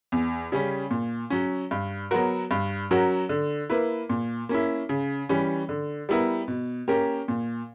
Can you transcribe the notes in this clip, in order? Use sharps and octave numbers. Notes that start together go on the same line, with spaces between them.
E2
C#3 G3 C#4
A#2
F#3 C#4
G2
F#3 B3 F#4 A#4
G2
F#3 C#4 F#4 A#4
D3
A#3 E4 B4
A#2
A#3 C#4 E4
C#3
E3 G3 C#4
D3
G3 B3 E4 A#4
B2
A#3 C#4 G4 A#4
A#2